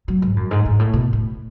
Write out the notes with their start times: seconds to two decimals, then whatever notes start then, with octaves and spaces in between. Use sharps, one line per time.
0.08 F#3
0.22 G#2
0.36 F#2
0.51 G#2
0.65 G#2
0.79 A2
0.93 B2
1.13 A2